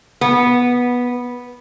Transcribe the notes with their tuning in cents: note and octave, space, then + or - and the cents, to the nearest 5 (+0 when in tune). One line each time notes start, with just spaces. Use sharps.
B3 -10